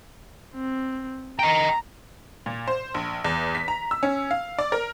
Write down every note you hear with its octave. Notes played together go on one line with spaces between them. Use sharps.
C4
D#5 G5 A#5
A#2
C5
A#1
E2
B6
A#5
E6
C#4
F5
D5
A#4